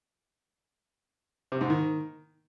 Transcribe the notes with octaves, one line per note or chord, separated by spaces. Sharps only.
C3
G#2
D#3